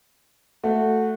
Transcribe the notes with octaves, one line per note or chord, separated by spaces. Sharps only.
A3 F#4